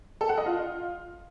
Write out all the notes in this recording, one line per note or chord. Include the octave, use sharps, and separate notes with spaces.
A4
F#5
D#5
F4